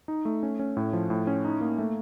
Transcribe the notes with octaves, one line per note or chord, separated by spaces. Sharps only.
D#4
A3
C#4
C#4
A2
F3
A2
C#4
D#4
A#3
A3